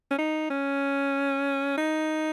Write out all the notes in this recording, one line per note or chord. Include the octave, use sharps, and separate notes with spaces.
C#4
D#4
C#4
D#4